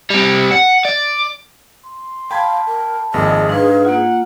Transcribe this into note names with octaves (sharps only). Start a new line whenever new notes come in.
G3 C4
F#5
D5
C6
F5 G5 A5 B5 G#6
A#4
G#1 F2 A#2 G#4 D#5
G#2 D4 B4 F5
A#3 F4 F#5